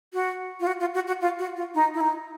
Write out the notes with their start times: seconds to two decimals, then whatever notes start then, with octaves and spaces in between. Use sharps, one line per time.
0.14 F#4
0.60 F4
0.67 F#4
0.80 F4
0.94 F#4
1.07 F#4
1.21 F4
1.39 F#4
1.56 F4
1.74 D#4
1.94 E4
2.01 D#4